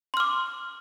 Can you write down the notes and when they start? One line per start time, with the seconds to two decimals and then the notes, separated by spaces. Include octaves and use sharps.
0.14 C6
0.17 F6
0.20 D6